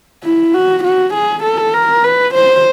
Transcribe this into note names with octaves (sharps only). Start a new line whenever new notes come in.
E4
F#4
F#4
G#4
A4
A#4
B4
C5